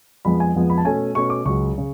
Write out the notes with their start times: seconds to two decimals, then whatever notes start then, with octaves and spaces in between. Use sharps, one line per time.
0.25 F2 F3 G#3 B3 B5
0.40 G#5
0.55 F2 F3 G#3 B3
0.70 B5
0.78 A5
0.85 B2 A3 C#4 G#5
1.15 B2 A3 C#4 C#6
1.30 D6
1.45 C#2 C#3 F#3 C#6
1.78 C#3